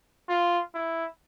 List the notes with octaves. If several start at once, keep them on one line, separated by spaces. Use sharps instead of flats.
F4
E4